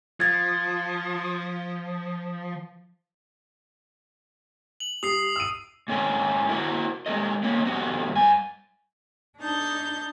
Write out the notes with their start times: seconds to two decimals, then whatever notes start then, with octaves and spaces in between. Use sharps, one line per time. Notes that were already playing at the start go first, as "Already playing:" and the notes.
0.20 F3 G#6 A6
4.80 F#7
5.03 G3 D#6 C7
5.36 E6 D#7
5.88 G#2 C#4 G#4 A#4 G5
6.49 E4 F#4 A#4 C5 F#5
7.06 G#3 G4 A#4 D#5
7.43 A#3 B3 C#4 F4 G#4
7.65 F2 F3 B3 F#4 G4 F#5
8.12 G2 G#5
9.38 D4 D#4 A5 G6